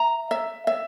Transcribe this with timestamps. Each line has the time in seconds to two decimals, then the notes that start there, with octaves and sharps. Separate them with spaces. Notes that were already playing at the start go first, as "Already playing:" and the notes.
Already playing: E5 A#5
0.31 E5
0.67 E5